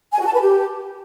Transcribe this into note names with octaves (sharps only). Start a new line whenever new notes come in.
G#5
F#4
A5
B4
G4